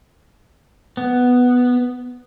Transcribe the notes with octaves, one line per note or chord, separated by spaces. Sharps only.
B3